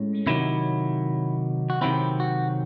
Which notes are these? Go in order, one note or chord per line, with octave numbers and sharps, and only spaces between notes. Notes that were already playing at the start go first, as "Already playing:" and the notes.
Already playing: A2 G#3 C#4
C3 D#3 F#3 E4
F#4
C3 D#3 F#3 C4 E4
F#4